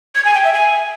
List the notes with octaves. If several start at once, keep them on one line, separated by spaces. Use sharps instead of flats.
G#6
G#5
G5
E5
G#5